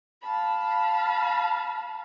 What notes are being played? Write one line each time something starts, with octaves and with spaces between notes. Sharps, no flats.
F5 A5 B5